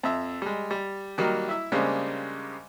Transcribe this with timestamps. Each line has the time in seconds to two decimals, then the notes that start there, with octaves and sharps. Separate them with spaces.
0.03 F2 E5
0.42 G3 G#3
0.71 G3
1.18 D#3 F#3 G3 A#3
1.49 E4 E5
1.72 C#3 G3 G#3 A#3 C4 D4